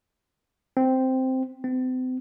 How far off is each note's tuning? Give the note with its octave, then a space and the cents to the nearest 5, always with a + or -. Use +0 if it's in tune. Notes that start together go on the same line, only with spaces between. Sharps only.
C4 -5
C4 -40